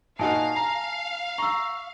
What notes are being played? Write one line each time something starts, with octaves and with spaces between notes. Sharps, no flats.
A#2 D#4 F#4 F5 G#5 A5
A#5
A#5 C#6 E6